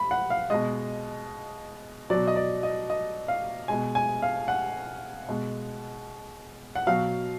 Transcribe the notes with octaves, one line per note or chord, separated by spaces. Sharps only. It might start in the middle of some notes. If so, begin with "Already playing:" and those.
Already playing: B5
F#5
F5
B2 G#3 D#5
B2 F#3 D5
D#5
D5
D#5
D#5
F5
B2 G#3 G#5
G#5
F5
F#5
B2 G#3
F#5
B2 F#3 F5